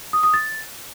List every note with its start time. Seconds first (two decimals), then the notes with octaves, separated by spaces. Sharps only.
0.13 D#6
0.23 D#6
0.34 A6